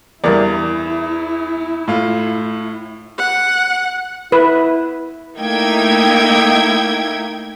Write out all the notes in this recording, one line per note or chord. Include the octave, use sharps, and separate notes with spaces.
E2 G3 E4 A#4 D5
A2 F4
F#5
E4 B4
A3 A#3 D#4 E4 G5 G#6